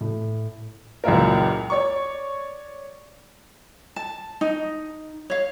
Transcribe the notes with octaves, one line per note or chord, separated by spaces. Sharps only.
A2
C#2 F#2 A#2 E4 F4 A#4
C#5 D5 C#6
A5
D#4
C#5 F5